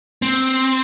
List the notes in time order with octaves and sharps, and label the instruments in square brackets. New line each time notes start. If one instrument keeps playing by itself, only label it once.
[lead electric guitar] C4